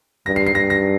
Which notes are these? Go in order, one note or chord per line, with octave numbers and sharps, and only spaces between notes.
G2 A#6
C7
C7
G2 A#6
A#6